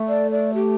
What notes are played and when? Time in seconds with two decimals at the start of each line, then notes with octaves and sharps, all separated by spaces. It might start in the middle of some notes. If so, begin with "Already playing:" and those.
Already playing: A3
0.08 D5
0.31 D5
0.54 G4